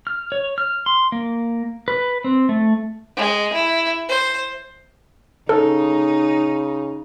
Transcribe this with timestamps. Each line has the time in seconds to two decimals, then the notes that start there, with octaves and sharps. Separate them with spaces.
0.07 F6
0.32 C#5
0.58 F6
0.86 C6
1.12 A#3
1.88 B4
2.24 C4
2.49 A3
3.16 G#3
3.53 E4
4.08 C5
5.49 C#3 D#4 A4